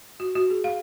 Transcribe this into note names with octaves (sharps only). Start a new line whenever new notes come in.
F#4
F#4
G#4
F5